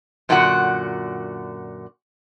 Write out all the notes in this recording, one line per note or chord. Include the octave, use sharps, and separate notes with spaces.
F#2 A#2 D3 F#4 F#5